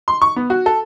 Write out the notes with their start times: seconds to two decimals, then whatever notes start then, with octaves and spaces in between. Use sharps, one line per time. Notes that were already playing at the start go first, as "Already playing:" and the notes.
0.08 C6
0.22 C#6
0.36 B3
0.50 F#4
0.66 A4